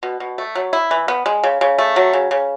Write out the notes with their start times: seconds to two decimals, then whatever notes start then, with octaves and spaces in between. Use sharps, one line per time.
0.03 B2
0.20 B2
0.38 A3
0.55 F#3
0.73 E4
0.91 E3
1.08 B3
1.26 G#3
1.44 C#3
1.61 C#3
1.78 A3
1.96 F#3
2.13 C#3
2.31 C#3